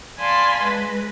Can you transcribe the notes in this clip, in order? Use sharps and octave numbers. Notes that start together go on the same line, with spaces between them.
D5 F5 G#5 A5 B5 C6
G#3 B4